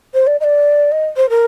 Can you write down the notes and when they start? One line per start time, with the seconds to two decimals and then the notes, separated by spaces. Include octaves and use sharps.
0.14 C5
0.27 D5
0.40 D#5
0.44 D5
0.92 D#5
1.17 C5
1.30 A#4